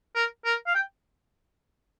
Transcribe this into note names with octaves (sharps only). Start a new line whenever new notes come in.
A#4
A#4
F5
G5